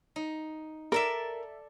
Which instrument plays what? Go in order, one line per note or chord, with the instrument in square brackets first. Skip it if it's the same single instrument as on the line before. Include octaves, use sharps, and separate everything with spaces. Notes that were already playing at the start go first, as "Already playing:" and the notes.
[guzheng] D#4
[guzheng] A4 D5 E5 [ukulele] A#4